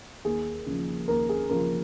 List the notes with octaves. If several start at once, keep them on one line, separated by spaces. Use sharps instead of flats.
D#2 G#4
C#3 F3
D#2 A#4
G#4
C#3 F3 A#4